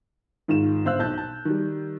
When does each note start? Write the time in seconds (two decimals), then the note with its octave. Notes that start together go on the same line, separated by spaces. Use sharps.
0.48 G#2 D#3 F4 E7
0.85 G1 C5 F5 E6 F#6
0.99 B1 A5 G6
1.18 A5
1.45 D#3 G3